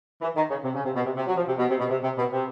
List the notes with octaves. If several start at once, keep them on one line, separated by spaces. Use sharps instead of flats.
E3
D#3
C#3
C3
C#3
C3
B2
C3
C3
F#3
F3
C3
B2
C3
B2
C3
C3
B2
C3